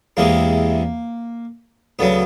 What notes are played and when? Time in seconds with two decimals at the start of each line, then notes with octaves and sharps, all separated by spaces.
0.17 E2 C3 E3 G#3 A#3
1.99 D2 C#3 F#3 B3